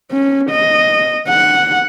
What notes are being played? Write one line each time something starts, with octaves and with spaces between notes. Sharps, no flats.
C#4
D#5
F#5